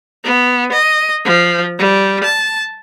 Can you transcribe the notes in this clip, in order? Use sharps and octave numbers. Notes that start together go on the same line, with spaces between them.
B3
D#5
F3
G3
A5